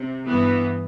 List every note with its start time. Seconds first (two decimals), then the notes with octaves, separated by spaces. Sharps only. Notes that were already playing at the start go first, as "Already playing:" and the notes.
Already playing: C3
0.25 G2 E3 B3